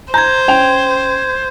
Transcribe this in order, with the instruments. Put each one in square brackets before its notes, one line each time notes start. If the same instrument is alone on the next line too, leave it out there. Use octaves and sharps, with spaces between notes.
[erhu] C5 [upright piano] A#5 [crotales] G6 G#6
[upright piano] C#4 G5 F7